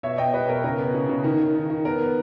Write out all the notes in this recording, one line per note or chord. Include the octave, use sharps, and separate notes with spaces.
B2 C#5 E5
B2 D#5 G5
G3 B4 D#5
B2 A#4
C#3 A#4
B3
C#3
C#3
D#3
D#3
D#3
D#3
B3 A#4
B3